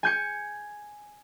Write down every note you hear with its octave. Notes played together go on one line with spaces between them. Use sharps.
G#5 G6 C#7